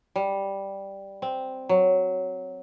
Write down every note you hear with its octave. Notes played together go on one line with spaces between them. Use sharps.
G3
C4
F#3